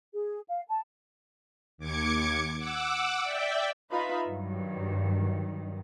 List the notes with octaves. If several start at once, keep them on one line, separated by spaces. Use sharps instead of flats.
G#4
F5
A5
D#2 D6 G#6 C#7
F#5 D6 E6
D5 E5 G5
D#4 F4 B4 E5 F5 B5
G2 D#3 F#3